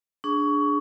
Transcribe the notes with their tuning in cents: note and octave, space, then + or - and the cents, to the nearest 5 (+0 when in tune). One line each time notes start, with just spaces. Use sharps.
D4 +0 G#4 +0 C#6 +20